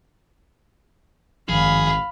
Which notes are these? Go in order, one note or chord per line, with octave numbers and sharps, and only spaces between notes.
G#1 G2 D#3 F3 G#4 F5 B5